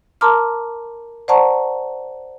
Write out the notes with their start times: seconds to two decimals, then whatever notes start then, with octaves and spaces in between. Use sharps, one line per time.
0.21 A#4 A5 A#5 C6 D6 F6
1.28 C5 D5 F#5 A5 A#5 C#6